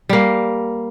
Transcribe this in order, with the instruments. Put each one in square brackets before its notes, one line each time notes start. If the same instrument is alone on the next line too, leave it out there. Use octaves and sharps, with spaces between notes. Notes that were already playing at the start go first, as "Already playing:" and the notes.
[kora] G3 A#3